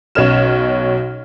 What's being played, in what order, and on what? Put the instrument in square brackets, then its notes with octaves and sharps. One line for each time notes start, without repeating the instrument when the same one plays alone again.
[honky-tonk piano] B1 C#4 C#5 D#5 F6 E7